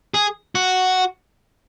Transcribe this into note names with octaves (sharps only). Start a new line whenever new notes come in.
G#4
F#4